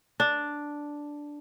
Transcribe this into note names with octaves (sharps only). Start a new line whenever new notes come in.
D4